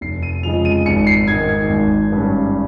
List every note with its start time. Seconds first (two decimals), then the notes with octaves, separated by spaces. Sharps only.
0.01 F1 C7
0.23 D#7
0.43 F2 C#3 F3 G#3 F7
0.65 D#7
0.86 G#1 C#7
1.07 C7
1.28 G#2 D#3 G#6
1.49 G#6
1.70 G#1
2.12 G2 G3 C#4